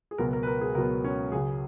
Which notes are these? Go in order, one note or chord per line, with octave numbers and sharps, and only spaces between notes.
G#4
C#2 B2 F#3 B3 A#4
A#4
B4
A#4
G#4
C#2 B2 F#3 B3 A#4
C#4
C#2 C#3 F#3 G#4